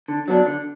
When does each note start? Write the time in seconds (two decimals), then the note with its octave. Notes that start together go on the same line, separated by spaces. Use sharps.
0.08 D3
0.28 F#3 B3 D4
0.46 D3